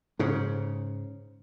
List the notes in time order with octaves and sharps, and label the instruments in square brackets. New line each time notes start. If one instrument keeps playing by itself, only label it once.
[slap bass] G#2 C#3